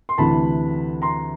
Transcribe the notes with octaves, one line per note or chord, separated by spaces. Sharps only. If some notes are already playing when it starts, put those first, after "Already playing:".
C6
D2 C3 E3 A5 B5
A#5 C6